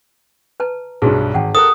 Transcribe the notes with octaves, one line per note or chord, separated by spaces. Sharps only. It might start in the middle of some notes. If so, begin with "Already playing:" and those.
B4 A5 A#5
B1 G2 F#4 G#4
G#1 F#5 G5 A5
A4 A#4 D#6 F#6